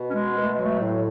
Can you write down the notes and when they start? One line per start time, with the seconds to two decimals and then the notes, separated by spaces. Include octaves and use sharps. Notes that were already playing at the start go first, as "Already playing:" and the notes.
Already playing: B2
0.10 C#4
0.15 G#3
0.37 B2
0.42 A3
0.53 G#3
0.58 F#3
0.65 A3
0.80 A2